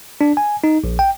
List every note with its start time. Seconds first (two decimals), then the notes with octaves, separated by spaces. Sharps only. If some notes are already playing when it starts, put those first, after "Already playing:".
0.21 D4
0.37 G#5
0.64 D#4
0.84 A#1
0.99 G5